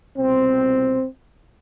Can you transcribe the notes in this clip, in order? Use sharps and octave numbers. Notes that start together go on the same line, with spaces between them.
C2 B2 C4